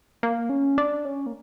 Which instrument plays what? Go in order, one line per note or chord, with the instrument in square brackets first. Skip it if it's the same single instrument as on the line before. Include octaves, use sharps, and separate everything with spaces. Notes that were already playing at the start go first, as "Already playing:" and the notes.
[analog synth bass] A#3
C#4
D4
C#4
A#3